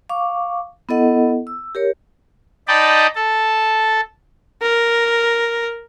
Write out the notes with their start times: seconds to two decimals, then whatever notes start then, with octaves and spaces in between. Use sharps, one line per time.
0.09 F5 C#6 D6
0.89 B3 E4 A4 D#5 F#5
1.47 E6
1.75 G4 A#4 C#5
2.68 D#4 D5 D#5 G5 A5 B5
3.15 A4 A5
4.62 A#4